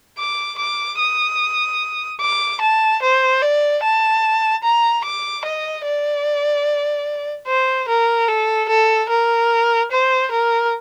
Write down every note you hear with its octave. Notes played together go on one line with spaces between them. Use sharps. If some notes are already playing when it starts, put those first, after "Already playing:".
D6
D6
D#6
D6
A5
C5
D5
A5
A#5
D6
D#5
D5
C5
A#4
A4
A4
A#4
C5
A#4